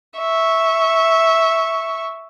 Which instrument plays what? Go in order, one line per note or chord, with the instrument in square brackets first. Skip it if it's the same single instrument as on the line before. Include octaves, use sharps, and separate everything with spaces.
[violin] E5 C#6